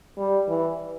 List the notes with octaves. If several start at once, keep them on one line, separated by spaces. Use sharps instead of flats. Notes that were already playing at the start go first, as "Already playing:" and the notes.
G3
E3